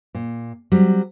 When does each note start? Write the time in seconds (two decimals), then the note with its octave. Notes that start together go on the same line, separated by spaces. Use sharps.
0.14 A#2
0.72 F#3 G3 C4